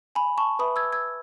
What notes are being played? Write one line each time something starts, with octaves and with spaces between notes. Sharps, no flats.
G#5 B5
A5 C#6
B4 E5 B5 D#6
E6 G#6
E6 G#6